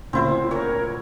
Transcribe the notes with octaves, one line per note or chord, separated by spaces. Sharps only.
D2 A#2 C#3 C4 E4 C5
A#4 C#5